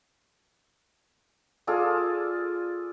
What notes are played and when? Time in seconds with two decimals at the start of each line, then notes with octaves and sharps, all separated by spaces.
1.67 F4 G#4 A4 D5